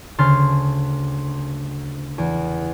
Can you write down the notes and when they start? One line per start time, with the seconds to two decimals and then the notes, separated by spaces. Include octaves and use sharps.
0.18 D2 C#3 C6 F6 A6
2.18 E2